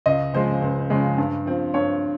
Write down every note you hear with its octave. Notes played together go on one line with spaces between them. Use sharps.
C#2 D#5
C#3 F3 G#3 C5
C#2
C#3 F3 G#3
G2
F3 C4
G2 C#5